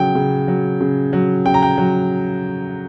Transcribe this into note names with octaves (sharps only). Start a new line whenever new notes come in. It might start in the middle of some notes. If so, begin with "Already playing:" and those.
Already playing: C#3 F#3 G5
C#3
F#3
C#3
F#3
C#3 G5
A#5
G5
F#3